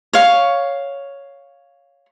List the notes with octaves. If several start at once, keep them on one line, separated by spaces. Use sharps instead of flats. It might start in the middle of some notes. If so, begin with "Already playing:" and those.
C#5 F5